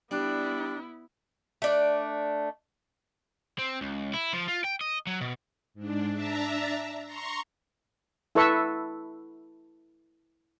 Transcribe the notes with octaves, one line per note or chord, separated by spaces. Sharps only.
G3 B3 D4 E4
A3 D4 D5
C4
C#2
E4
F3
F4
G5
D#5
F#3
B2
G#2 D4
D4 E5 A5 A#5
A#5 C6 C#6
E4 A4 B4 E5 C#6